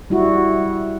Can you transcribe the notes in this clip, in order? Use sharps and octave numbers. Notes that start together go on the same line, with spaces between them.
G3 E4 F#4